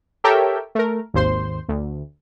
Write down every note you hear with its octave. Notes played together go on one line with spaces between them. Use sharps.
G4 A4 A#4 C#5 E5 G5
A3 A#4
G#1 D#2 C5 C6
D2